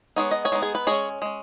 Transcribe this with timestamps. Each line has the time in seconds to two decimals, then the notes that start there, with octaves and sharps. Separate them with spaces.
0.16 G#3 B3 D#4 C#5
0.31 D#5
0.45 G#4 C#5
0.52 G#3 B3 D#4
0.62 G#4
0.75 B4
0.87 G#3 C#4 G#4 C#5
1.22 G#3 C#4